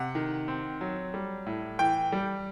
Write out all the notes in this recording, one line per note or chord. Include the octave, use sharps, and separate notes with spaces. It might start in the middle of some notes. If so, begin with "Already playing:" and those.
Already playing: C3 F#5
D#3
C4
F#3
G3
A2
E3 G5
G3